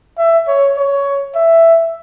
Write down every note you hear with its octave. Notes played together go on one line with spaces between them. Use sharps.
E5
C#5
C#5
E5